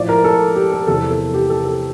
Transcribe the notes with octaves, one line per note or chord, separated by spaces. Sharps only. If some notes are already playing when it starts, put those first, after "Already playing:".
Already playing: A2 F3 D5
A#4
A4
G4
A4
E2 C3 F3 A4
A4
G4
A4
A4